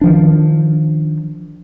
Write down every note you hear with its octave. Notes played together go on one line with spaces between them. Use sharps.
D#3 F3 D4